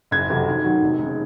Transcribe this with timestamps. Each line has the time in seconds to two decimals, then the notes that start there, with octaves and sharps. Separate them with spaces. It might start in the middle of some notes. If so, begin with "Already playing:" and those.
0.11 F#1 G#6
0.29 F2 C3 F#3
0.47 D#2
0.64 D#3 F#3
0.82 F1
0.99 D#2 C#3